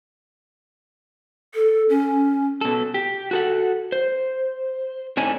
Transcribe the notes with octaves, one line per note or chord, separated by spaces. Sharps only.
A4
C#4
B2 A4
G4
F#4 A4 F#5
C5
A2 C4 D4 D#4 C#5 G#5